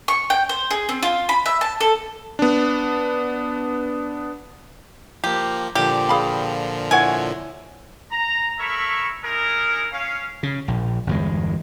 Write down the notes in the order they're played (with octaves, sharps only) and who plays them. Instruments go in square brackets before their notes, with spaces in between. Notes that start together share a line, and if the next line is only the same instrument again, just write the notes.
[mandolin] C#6
G5
C5
G#4
C4
F4
B5
E5
A5
A4
[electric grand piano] B3 D4
[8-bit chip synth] F3 A#3 [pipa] G4
[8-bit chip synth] A#2 D3 F3 [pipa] G4
[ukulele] G#4 F5 B5
[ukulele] E4 C#5 F#5 [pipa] G#5
[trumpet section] A#5
A4 A#4 C#5 E5 B5 C#6
D#4 E4 G#4 A#4
C#4 F5
[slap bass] C#3
A#1
G1 E2 G#3